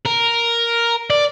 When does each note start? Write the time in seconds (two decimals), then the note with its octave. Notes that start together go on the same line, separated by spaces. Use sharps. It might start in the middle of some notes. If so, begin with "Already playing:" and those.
0.06 A#4
1.10 D5